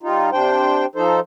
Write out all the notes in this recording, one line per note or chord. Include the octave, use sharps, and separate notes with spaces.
G3 D#4 F4
C3 D4 C5 G5
F3 D#4 A4 C5